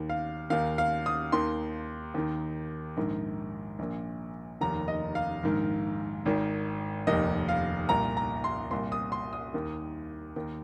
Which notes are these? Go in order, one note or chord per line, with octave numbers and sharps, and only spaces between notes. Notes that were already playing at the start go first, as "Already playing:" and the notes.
Already playing: D#2 D#3
F5
D#2 D#3 F5
F5
D#6
D#2 D#3 C6
D#2 D#3
A#1 G#2 D#3
A#1 A#2
F1 D#2 D#3 A#5
D#5
F5
A#1 G#2 D#3
G#1 G#2 D#3
F1 D#2 D#3 D#5
F5
C2 A#2 A#5
A#5
C6
C2 A#2 C6
D#6
C6
D#6
D#2 D#3
D#2 D#3